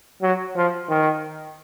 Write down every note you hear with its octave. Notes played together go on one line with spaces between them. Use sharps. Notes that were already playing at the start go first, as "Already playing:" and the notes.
F#3
F3
D#3